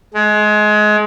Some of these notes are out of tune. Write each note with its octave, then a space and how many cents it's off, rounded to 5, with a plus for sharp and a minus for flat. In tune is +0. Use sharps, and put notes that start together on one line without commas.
G#3 +25